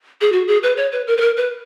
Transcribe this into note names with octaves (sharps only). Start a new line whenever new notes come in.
G#4
F#4
G#4
B4
C#5
B4
A#4
B4
A#4
B4